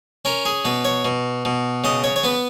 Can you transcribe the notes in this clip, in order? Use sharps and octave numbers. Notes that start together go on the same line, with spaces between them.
C#4 A#4
G#4
B2 B4
C#5
B2
B2
C#3 D#5
C#5
C#5
B3 B4